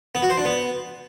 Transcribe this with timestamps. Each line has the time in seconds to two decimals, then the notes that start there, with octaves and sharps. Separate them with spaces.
0.15 B3
0.22 F#4
0.30 C5
0.38 D4
0.45 B3